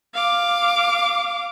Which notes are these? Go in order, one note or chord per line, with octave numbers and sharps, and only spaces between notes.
F5 D6